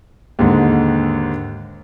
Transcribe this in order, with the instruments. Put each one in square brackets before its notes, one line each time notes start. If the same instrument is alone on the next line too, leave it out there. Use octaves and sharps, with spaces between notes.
[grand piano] D#2 G#2 D3